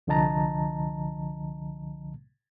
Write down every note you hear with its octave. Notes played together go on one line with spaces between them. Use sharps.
C2 D3 F3 D#5 A5 A#5